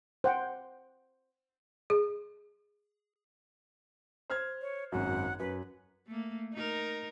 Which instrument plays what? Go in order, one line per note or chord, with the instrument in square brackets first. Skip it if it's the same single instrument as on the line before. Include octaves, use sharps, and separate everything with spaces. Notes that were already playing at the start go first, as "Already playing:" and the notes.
[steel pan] C5 F#5 G5
[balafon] G#4
[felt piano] C5 F6 G#6
[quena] C#5
[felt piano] G#1 F#2 [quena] F#5
[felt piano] F#2 [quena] B4
[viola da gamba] A3 A#3
D#4 A#4